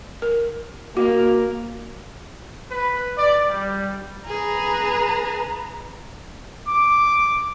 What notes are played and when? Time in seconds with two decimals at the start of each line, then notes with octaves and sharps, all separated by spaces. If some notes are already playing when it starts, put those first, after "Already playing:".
0.22 A#4
0.97 A#3 F#4
2.71 B4
3.17 D5
3.49 G3
4.27 G#4 B4 A#5
6.69 D6